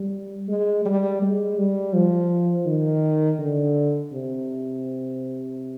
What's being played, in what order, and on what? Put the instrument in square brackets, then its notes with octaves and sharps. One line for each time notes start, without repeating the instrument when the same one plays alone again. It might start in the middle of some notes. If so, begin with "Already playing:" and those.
Already playing: [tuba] G3
G#3
G3
G#3
G3
F3
D#3
D3
C3